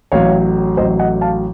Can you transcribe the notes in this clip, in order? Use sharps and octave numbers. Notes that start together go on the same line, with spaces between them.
A1 A2 F#3 C#5 F5
A1 A2 F#3 C5 D#5
D#5 F#5
F5 A5